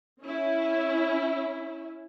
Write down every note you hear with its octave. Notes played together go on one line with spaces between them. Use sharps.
C#4 E4